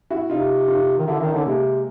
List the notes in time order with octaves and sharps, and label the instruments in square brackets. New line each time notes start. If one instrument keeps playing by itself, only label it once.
[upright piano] E4 F#4
[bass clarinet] C3 [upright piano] D#4 F4
[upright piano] D#4 F4
[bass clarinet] D#3
[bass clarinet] D3 [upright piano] E4 F#4
[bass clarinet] D#3 [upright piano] D4 E4
[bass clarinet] D3 [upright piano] C#4 D#4
[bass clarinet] C3 [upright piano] G#3 A#3